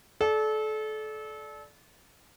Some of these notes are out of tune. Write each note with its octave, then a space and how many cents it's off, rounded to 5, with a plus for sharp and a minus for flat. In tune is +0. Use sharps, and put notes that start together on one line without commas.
A4 -30 D5 +0